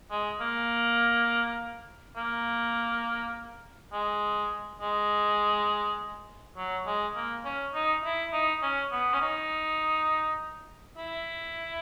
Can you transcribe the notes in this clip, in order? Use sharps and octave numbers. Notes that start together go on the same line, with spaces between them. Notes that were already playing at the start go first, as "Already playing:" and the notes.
G#3
A#3
A#3
G#3
G#3
F#3
G#3
A#3
C#4
D#4
E4
D#4
C#4
B3
C#4
D#4
E4